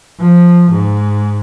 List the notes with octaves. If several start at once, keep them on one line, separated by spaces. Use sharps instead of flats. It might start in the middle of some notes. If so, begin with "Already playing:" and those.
F3
G#2